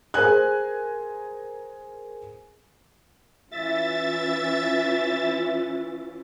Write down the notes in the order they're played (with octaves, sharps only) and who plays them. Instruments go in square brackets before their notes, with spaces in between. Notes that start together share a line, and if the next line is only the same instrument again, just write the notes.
[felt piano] G#4 A#4 C5 G#5 F#6
[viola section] E3 C#4 F4 [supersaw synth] E5 A6